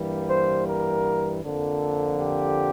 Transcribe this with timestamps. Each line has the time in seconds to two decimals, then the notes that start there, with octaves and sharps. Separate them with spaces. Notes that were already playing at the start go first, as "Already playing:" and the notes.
Already playing: G2 E3 G3 A#3
0.29 C5
0.67 A#4
1.43 F2 D3 F3 A#3 A4
2.19 G4